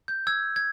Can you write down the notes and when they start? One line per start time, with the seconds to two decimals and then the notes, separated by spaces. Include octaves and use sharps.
0.08 G6
0.27 E6 G#6
0.56 G#6